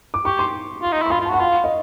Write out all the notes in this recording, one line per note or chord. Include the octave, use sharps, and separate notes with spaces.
D6
G4 C#6
C6
F4
D#4
E4
C6
F4 B5
F4
F#4 A5
F#5
F4 F5
D#5